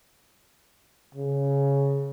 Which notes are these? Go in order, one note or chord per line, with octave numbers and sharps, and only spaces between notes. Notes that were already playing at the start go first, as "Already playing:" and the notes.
C#3